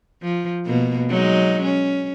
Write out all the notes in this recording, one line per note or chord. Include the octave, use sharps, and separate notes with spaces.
F3
B2 A#3
F#3 G#3 D#4
C#4